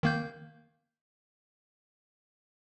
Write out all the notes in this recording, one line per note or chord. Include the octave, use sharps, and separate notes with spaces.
D#3 A#3 G6